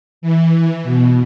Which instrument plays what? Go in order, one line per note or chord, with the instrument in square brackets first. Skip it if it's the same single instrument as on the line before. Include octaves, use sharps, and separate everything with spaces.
[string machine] E3
B2